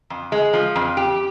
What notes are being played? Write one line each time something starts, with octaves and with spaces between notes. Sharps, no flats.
F2
G#3
F3
F2
G4